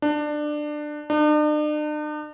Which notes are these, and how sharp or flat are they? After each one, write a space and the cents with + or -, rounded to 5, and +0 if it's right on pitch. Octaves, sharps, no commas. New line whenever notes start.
D4 +20
D4 +45